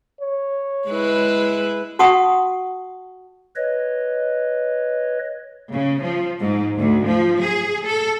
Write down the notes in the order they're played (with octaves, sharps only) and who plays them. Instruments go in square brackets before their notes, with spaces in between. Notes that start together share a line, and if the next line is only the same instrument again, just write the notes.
[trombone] C#5
[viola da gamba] G#3 E4 B4
[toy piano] F#4 F#5 A5 C#6 D#6
[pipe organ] B4 C#5 D#5
[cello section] C#3
F3
G#2
D2
F3
G#4
A4